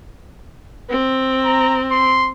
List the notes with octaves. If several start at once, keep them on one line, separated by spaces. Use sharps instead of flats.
C4
A#5
C6